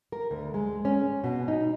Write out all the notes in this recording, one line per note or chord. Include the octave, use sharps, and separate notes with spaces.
A#4
D2
G#3
C#4
B2
D#4